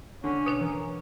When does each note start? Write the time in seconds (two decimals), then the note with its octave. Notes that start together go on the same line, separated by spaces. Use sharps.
0.24 D3 C#4
0.46 B2 D4 B4 C#5
0.61 E3 A#4